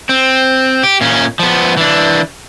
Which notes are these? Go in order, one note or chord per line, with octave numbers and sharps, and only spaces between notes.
C4
G4
A#2 C#4
F3 B3
E3 D4